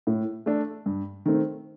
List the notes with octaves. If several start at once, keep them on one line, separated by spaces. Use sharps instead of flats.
A2
A3 D4 A4
G2
D#3 A3 C4